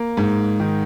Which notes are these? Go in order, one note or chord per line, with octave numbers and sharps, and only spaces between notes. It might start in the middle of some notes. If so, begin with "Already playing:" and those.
Already playing: A#3
G#2
D#3